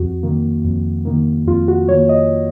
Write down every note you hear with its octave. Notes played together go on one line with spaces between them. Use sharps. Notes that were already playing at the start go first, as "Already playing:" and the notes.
Already playing: F2 F#4
D#3 A#3
F2
D#3 A#3
F2 F4
F#4
D#3 A#3 C#5
D#5